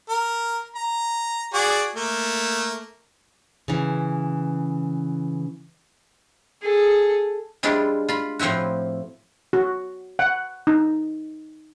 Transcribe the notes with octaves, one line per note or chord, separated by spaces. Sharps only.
A#4
A#5
F#4 G#4 D5
A3 A#3
C#3 E3
G#4 A4
G3 G#3 D4 E4 F4
F4 B5
A2 F3 C4 E4 F#4
F#4
F#5
D#4